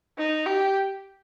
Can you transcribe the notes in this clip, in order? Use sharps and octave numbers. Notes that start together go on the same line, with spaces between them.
D#4
G4